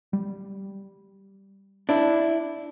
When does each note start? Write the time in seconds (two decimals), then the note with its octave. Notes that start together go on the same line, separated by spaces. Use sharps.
0.13 G3
1.89 D4 E4